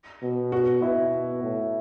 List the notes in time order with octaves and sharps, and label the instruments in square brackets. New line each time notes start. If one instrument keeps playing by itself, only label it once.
[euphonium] B2
[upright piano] F#4
[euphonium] B2 [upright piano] E4
[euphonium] A2